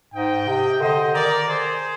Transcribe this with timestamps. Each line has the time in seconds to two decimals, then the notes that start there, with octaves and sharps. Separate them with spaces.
0.14 G#2 D#5 G5
0.48 C3
0.81 D3 C5 D#5
1.14 D#3 A#4 D5
1.48 G#4 C5